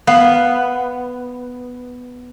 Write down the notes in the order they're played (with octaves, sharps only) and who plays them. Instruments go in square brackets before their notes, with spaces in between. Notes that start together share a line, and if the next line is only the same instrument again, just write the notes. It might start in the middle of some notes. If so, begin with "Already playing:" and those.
[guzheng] B3 [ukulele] F5